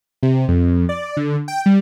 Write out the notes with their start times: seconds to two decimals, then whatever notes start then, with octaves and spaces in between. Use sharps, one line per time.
0.23 C3
0.48 F2
0.89 D5
1.17 D3
1.48 G5
1.66 G3